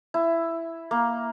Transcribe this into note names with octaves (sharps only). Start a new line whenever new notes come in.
E4
A#3